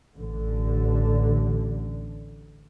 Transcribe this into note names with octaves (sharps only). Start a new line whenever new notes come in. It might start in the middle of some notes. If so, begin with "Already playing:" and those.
A1 D3